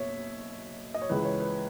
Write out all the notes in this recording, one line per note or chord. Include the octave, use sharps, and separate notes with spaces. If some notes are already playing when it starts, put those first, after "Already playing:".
Already playing: F#1 B2 C#5 E5
D#5
C#5
C#2 C#3 E3 B4
C#5
B4